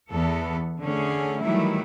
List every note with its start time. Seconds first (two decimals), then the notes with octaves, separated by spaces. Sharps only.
0.10 E2 B3 A4
0.84 D3 A3 C#4 G#4
1.41 D#3 E3 F#3 G3 A3 E4